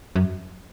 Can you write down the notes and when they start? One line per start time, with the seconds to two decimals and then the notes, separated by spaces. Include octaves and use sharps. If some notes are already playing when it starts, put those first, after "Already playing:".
0.16 F#2